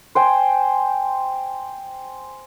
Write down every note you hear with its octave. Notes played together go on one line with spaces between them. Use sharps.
C5 G5 G#5